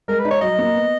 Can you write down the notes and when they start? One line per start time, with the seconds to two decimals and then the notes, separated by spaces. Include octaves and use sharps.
0.08 G#3 A#4
0.19 B4
0.25 D#4
0.31 C#5
0.41 F#3 D#5
0.58 A#3
0.75 B3